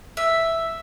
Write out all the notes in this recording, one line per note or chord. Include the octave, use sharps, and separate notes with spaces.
E5